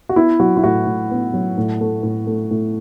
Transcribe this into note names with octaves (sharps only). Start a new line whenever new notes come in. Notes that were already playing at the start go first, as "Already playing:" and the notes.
F#4
B3 E4
F#3 F#4
E4
A2 F#4
A2
B3
F#3
A2
A3
A2
A3
A2